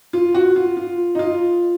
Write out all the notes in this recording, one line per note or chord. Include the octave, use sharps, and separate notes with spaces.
F4
F#4
F4
F4
D#4
F4